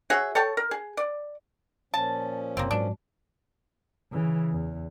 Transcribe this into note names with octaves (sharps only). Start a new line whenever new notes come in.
F#4 G#4 C#5 E5
A4 C#5 G5 A5
A#4
G#4
D5
A#2 F3 C#4 A5
F#1 C3 A#3 C4
G#2 F#3 D4
C#3 E3
E2